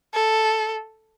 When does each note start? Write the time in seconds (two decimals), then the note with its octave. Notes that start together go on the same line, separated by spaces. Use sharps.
0.14 A4